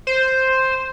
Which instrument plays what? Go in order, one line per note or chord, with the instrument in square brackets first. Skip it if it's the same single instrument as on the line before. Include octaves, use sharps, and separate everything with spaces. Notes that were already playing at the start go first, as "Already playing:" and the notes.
[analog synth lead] C5